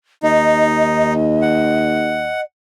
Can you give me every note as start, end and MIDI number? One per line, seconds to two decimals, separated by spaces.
0.23 2.36 39
0.23 1.13 63
0.23 2.44 75
1.42 2.41 78